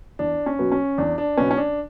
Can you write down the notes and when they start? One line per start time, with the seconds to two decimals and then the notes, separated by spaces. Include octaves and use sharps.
0.19 E2 D4
0.46 C#4
0.59 B2 F#3 B3
0.72 C#4
0.98 E2 D4
1.18 D4
1.37 B2 F#3 B3 C#4
1.51 C#4
1.57 D4